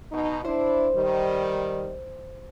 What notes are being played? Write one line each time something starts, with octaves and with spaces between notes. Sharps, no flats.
B2 D#4
D4 E4 C5
D#3 G3